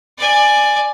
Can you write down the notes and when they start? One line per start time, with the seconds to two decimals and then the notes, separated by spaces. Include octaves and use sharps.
0.18 D5 G#5